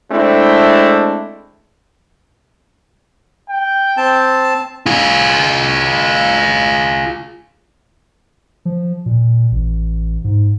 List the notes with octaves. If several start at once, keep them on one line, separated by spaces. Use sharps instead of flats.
G#3 A3 C4 D4 E4
G5
C4 A5
F4 G#4
F3
A#2
A1
G#2